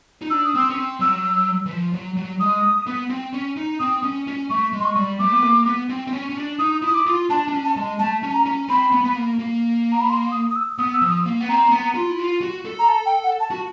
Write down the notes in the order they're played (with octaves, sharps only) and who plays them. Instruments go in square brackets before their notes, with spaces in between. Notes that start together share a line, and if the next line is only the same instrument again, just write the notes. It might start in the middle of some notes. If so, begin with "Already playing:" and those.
[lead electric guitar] D#4
[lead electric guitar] D4 [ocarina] E6
[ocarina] D#6
[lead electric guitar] C4 [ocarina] E6
[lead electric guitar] C#4
C4
[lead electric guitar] F#3 [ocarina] E6
[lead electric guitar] E3
F3
F#3
F#3
[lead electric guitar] G#3 [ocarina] D#6
[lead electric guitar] B3
C4
C#4
D#4
[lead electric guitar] C4 [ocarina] D#6
[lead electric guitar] C#4
C#4
[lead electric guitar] A3 [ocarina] C#6
[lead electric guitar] G#3
[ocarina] C6
C#6
[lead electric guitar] G3
[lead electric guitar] A3 [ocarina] D6
[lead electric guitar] B3
A#3
B3
C4
C4
C#4
C#4
D4
[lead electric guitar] D#4 [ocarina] D#6
[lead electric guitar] E4 [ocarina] D#6
[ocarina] D6
[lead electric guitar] F4
[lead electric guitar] D4 [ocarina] A5
[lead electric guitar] D4
C#4
[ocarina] A5
[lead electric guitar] G#3
[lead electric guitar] A3 [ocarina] A5
[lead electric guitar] C#4
[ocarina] A5
A#5
[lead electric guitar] C#4
[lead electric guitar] C4 [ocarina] B5
[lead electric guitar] B3
B3
A#3
A#3
[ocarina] A#5
B5
C6
D#6
D#6
E6
[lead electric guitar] B3 [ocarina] D#6
[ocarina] E6
[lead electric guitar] F3
[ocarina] D#6
[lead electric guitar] A#3
B3
[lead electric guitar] C4 [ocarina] A#5
[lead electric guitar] A#3
B3
F4
E4
F4
F#4
A4
[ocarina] A#5
A5
G5
F#5
A5
[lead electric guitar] F#4